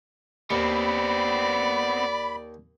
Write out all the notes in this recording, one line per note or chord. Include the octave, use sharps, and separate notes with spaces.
D#2 B3 C4 D5 B5